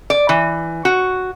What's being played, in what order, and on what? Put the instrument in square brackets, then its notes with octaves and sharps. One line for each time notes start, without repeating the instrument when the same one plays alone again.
[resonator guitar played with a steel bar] D5
E3
F#4